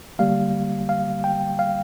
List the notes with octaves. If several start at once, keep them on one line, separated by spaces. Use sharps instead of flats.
D3 G3 A#3 F5
F5
G5
F5